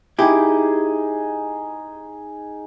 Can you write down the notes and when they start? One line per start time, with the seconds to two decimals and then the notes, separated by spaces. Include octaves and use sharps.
0.19 D#4 E4 G4 G#4